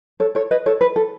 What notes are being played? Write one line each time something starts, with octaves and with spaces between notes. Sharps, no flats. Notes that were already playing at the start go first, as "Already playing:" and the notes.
A4 C#5
A4 C#5
B4 D#5
A4 C#5
B4
A4